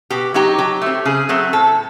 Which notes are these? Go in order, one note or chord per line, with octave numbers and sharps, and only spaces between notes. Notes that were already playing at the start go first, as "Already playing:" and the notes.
B2 G4
F#3 B3 D#4 G4
F#3 G4
A3 C4
C#3 G#4
F#3 A3 C4
A2 A4